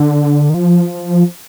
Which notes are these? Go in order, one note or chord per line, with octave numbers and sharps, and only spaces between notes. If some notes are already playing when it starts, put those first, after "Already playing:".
Already playing: D3
D#3
F3